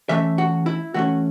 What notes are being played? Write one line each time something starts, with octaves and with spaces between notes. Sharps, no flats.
E3 A3 C#4 E5
F#4
E4
E3 A3 C#4 F#4